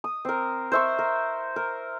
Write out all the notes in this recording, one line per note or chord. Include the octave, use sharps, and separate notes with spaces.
D#6
C4 A#4
C5 E5 C#6
A#4
A#4